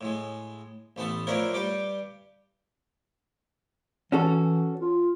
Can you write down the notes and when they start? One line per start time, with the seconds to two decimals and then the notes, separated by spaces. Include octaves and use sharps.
0.01 A2 G#3
0.96 A1 A3 B3 A5
1.27 F3 A3 D4 E4 A#4 C#5
1.54 G2 G3 G4 D6
4.12 E3 C#4 F#4 A4
4.81 F4